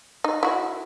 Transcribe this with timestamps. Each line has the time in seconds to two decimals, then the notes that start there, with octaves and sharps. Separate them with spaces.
0.24 D#4
0.43 E4 F#4